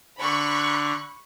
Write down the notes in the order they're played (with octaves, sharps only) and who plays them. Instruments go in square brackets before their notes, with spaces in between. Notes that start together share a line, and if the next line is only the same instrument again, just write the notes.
[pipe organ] D3 [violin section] B5 C#6 F#6